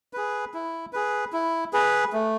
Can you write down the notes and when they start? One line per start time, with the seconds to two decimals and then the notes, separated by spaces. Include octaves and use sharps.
0.13 G#4 B4
0.54 E4
0.93 G#4 B4
1.33 E4
1.73 G#4 B4
2.13 A3